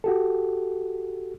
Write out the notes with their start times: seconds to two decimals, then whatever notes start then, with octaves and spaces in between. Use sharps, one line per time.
0.04 F#4 G4 A4